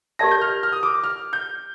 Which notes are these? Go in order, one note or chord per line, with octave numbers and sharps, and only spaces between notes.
G4 A#4 D5 A5 A#6
G6
F6
F6
D#6
D6
F6
G6